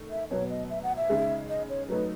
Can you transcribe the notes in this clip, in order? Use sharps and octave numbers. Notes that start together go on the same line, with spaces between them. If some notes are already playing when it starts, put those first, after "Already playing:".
Already playing: D#3 A3 D#4
E5
B2 F#3 B3 C#5
D#5
E5
F#5
E5
C#3 G#3 D#4 G#4
D#5
C#5
F#3 A3 D#4 B4